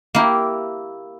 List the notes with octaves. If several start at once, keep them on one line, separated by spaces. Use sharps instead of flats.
A#3 E4 G4